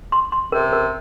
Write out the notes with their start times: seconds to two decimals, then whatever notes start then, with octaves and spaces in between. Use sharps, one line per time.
0.12 C6
0.32 C6
0.52 C3 A#4
0.73 A#4